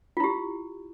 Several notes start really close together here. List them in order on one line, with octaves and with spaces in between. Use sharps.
F4 E4 G4